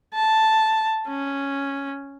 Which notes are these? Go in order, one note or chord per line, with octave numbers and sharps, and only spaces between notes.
A5
C#4